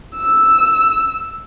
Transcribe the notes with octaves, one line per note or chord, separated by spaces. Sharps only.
E6